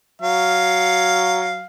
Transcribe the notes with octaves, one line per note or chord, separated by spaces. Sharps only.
F#3 F5